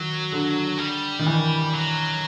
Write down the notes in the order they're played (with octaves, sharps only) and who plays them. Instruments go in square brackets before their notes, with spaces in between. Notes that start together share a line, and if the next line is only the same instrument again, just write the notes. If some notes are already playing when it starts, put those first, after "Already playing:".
Already playing: [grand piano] D#3 [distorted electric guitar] F#3
[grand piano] D3
[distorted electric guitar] G3
[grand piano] D#3
E3
[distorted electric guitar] F#3